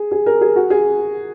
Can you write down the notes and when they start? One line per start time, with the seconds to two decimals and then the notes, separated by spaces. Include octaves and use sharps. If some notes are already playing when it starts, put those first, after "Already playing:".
Already playing: G#4
0.12 G#4
0.26 A#4
0.41 G#4
0.56 F#4
0.70 G#4